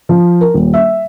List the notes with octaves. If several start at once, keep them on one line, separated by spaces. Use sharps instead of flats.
F3
A#4
D#1
E5